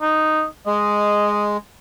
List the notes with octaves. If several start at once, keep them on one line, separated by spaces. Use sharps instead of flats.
D#4
G#3 D#5